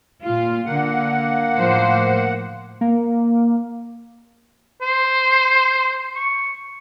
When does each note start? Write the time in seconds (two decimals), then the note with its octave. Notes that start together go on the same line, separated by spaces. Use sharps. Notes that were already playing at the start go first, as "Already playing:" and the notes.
0.23 A#2 F4
0.66 D3 A#3 F#5
1.55 A2 F3 C5
2.81 A#3
4.82 C5
6.16 C#6